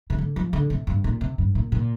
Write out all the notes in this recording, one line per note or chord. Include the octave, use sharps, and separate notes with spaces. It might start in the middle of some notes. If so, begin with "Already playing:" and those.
C3
D3
F3
D3
C3
G2
A#2
C3
G2
A#2
A#2